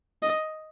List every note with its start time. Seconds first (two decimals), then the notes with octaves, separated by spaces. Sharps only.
0.23 D#5